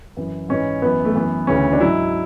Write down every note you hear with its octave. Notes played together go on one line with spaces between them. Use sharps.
F#2 E3
G#2 E3 C#4
F#2 E3 B3
A3
F#2 E3 B3
D2 C#3 E3 C#4
D4
G#2 F#3 E4